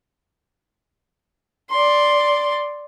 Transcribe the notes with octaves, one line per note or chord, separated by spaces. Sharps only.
D5 C6